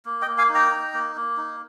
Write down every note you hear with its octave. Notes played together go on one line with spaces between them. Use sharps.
A#3
D#5 G5
A#3
F5 G#5
D#4
G5 A#5
D#4
A#3
A#3
D#4